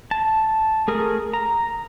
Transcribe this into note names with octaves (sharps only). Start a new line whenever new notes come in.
A5
A3 G#4 A#4
A#5